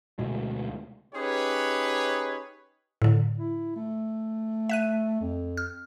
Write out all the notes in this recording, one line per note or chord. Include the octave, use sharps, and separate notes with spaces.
D2 B2 G#3
C#4 D#4 G4 G#4 B4 C#5
A2 D3
E4
A3
E5 F#6 D#7
F2
F6